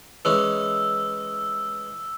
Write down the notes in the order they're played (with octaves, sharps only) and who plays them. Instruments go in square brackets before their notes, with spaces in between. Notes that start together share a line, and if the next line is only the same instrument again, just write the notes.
[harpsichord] E3 G#3 C#4 [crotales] E6